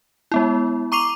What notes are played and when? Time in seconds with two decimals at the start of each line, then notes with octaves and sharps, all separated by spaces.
0.32 G#3 B3 E4
0.92 A#5 C#6 D6 C7 D#7 F7